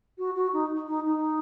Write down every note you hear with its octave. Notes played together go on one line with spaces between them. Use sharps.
F#4
F#4
D#4
D#4
D#4